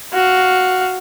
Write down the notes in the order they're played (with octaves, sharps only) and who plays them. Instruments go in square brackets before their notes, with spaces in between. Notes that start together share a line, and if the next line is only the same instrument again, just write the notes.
[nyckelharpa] F#4 F5